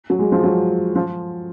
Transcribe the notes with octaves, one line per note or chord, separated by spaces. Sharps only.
F#3
G#3
F3
F#3
F3